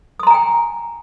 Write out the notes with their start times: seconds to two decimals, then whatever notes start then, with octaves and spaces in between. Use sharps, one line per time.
0.20 D#6
0.23 C6
0.27 A#5
0.31 G#5
0.34 G5